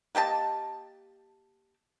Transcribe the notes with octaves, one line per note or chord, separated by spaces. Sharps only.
A#3 G4 D#5 A5